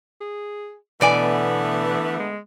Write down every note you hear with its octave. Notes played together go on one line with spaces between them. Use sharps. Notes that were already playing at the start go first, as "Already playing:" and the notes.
G#4
B2 D3 E3 A3 B3 D5 G#5
G#3